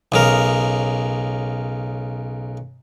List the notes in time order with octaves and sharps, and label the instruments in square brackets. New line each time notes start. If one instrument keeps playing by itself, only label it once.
[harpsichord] B1 C#3 A#4